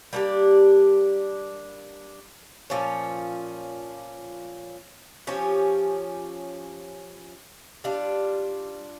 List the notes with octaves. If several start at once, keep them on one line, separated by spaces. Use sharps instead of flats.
G3 A#3 D4 G4
A#2 F3 C#4
F3 C#4 G4
G3 D4 F4